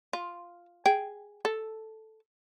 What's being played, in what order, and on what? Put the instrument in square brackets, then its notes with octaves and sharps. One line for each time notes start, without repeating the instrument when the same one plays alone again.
[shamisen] F4
G#4 G5
A4